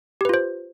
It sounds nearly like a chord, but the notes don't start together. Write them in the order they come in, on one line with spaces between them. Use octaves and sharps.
G4 B4 F4 C5